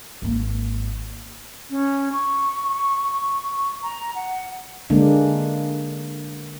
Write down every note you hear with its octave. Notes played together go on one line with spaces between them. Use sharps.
G#1 A#3
C#4
C#6
A#5
F#5
D3 G#3 A#3 D4